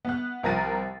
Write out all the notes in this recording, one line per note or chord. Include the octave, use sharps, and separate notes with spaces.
B3 F#6
C2 F3 A#4 A6 A#6 D#7